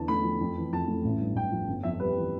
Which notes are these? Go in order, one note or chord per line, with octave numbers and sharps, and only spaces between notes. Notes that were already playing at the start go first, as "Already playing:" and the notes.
Already playing: E2 D3 A5
A3 B5
F3
F2
E3
F2 A5
A3
A1
G2
A1 G5
F3
G1
F2 E5
G3 B4
E3